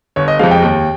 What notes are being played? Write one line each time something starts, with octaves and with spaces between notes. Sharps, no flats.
G1 C#5
D#5
F2 C3 F3 G#3 F5
G5
D#2